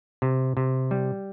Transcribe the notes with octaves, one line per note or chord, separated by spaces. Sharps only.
C3
C3
G3